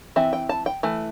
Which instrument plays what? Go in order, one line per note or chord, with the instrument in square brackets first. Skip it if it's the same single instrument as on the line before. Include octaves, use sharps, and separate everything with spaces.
[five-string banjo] E3 C4 E5
G5
A5
G5
E3 A3